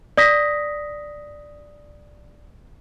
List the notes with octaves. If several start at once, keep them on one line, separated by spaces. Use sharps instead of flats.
D5 D#6 A#6 B6